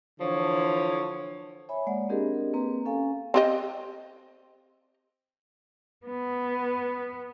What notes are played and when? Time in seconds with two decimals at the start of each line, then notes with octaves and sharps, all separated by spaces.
0.20 D3 E3 F3 C#5
1.69 C#5 E5 G#5 B5
1.87 G#3 A#3 D5 F#5
2.09 C4 D4 G4 G#4 A#4 D#5
2.54 A#3 C4 B4 A#5
2.85 C#4 A4 F5 G#5
3.34 C4 G4 D#5
6.07 B3